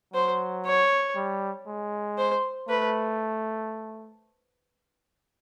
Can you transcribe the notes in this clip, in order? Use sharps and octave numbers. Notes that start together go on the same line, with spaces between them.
F#3 C5
C#5
G3
G#3
C5
A3 B4